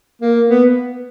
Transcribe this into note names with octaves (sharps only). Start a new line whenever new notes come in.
A#3
B3